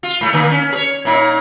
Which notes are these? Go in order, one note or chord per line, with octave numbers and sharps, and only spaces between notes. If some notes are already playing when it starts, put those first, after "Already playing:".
F4
G#2 A3
A#2 D3 A#3
C#4
G#4 C#5
A#2 D#4